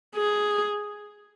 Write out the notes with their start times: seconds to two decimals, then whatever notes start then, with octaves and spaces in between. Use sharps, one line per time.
0.16 G#4